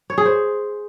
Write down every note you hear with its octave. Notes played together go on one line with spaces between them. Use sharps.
C#5
G#4
C5